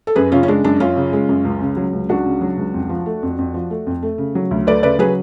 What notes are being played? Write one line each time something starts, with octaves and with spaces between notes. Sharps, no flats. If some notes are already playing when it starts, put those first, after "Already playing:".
A4
F#2 G#4 B4
C#3 C#4 F4
C#4
G#3 D4
F#2 D4
F#2 C#4 F4
C#3
G#3
F#2
C#2
C#3
F#3
C#2
C#2 D4 F#4
C#3
F#3
C#2
F2
F3
A3
F2
F2
F3
A3
F2
A3
C#3
F#3
D2
A3 B4 D5
C#3 B4 D5
F#3 G#4 B4